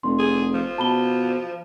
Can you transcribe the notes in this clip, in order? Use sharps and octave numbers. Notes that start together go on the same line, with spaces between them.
F1 C6
G#4
F3
B2 A5 B5 G7